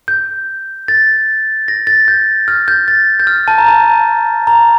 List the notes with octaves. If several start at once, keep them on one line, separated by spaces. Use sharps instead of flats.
G6
A6
A#6
A6
G6
F6
G6
A6
G6
F6
A5
A#5
A5
A#5